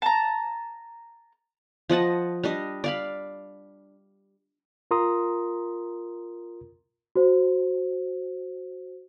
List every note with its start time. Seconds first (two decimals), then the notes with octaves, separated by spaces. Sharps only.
0.02 A5 A#5
1.90 F3 D#5 F#5 A5
2.44 G3 D4 D#5
2.84 D5 F5 B5
4.91 F4 A#4 A#5 C6 D#6
7.15 F#4 C5